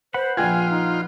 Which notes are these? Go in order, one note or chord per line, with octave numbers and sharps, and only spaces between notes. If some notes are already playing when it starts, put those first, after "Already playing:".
B4 C5 F#5 B5
A#1 F4 G5 G#5 G#6
D#4